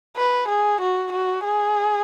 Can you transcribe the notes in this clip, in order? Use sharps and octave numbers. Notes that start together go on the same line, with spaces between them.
B4
G#4
F#4
F#4
G#4